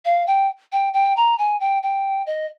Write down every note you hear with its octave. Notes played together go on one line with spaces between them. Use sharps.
F5
G5
G5
G5
A#5
G#5
G5
G5
D#5